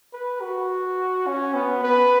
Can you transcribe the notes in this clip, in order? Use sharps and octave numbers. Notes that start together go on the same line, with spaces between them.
B4
F#4
C#4
B3
B4